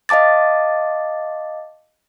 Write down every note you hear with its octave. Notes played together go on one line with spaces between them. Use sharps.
D#5 F5 A5 D6 A6